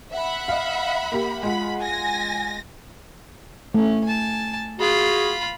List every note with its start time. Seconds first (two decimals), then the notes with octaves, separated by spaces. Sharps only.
0.12 E5 F#5 B5
0.48 D#5 F5
1.12 A#3 G4
1.43 G#3 F4 F#5 B5
1.79 G#5 A#6
3.74 A3 C#4
4.04 G#5 A5
4.79 F4 F#4 G#4 B5